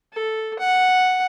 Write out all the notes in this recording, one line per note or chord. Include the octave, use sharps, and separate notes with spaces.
A4
F#5